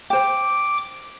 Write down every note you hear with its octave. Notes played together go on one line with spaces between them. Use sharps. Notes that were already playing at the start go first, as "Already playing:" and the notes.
C5 G5 D6